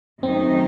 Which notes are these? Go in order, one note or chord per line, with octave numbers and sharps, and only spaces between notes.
F#2 D#3 A3 C4 D#4